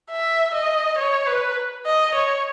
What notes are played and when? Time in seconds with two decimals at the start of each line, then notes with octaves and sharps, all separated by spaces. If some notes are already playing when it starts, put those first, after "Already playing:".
0.11 E5
0.54 D#5
0.98 C#5
1.27 B4
1.86 D#5
2.15 C#5